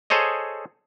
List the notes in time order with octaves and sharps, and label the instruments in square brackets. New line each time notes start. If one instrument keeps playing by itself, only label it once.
[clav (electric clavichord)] G#4 A4 C5 C#5 D#5